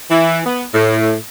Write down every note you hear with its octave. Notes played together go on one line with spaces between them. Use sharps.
E3
B3
A2